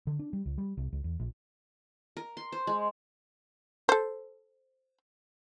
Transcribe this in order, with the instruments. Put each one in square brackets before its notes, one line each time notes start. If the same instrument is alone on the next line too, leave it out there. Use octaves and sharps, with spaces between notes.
[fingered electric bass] D3
D4
G3
C#2
G3
C2
C#2
E2
A#1
[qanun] A#4
C6
C5
G#3
[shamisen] A4 C5